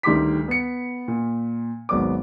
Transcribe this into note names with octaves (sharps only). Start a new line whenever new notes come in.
D2 D#3 G3 C6 D6 B6
B3 C#7
A#2
G#1 F#3 B3 D5 D6